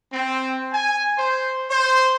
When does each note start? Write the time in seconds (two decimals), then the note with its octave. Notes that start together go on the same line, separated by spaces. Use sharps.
0.12 C4
0.72 G#5
1.17 C5
1.70 C5